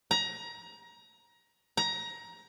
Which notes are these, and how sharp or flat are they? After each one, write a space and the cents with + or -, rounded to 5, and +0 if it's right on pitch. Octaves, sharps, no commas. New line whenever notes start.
A#5 +25
A#5 +20